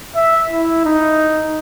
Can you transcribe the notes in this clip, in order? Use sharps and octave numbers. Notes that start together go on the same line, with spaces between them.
E5
E4
D#4